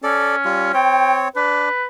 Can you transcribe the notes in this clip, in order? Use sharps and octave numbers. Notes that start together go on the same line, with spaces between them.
C#4 A4 D5
G3 F4
C4 C#5 G5
D4 B4